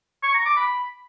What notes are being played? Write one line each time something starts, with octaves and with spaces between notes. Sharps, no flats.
C#6
A#5
D6
B5